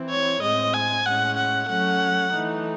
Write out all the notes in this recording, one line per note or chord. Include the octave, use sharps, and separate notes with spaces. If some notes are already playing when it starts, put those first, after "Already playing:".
Already playing: E3 C4 E4
C#5
A2 G#3 C4 D#5
G#5
A2 G#3 C#4 F#5
F#5
F#3 A3 C#4 F#5
E3 A3 D#4